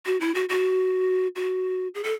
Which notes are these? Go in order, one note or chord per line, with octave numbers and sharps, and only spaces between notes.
F#4
E4
F#4
F#4
F#4
G#4
A4